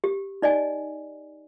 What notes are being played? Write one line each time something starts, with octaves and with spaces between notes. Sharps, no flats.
G4
D#4 D5 D#5 G#5